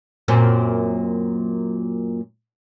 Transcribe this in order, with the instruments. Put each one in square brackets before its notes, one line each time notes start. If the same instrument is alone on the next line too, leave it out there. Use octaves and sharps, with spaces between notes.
[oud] F#2 A#2 C4